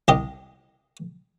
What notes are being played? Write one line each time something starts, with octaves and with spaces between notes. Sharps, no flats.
C2 G4 D#5